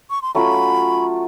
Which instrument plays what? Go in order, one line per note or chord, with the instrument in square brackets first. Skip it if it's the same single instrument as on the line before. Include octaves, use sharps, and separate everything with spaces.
[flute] C#6
C6
[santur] F#3 A3 C#4 F4 [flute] B5